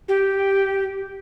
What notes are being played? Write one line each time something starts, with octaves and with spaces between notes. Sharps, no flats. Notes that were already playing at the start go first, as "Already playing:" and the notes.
G4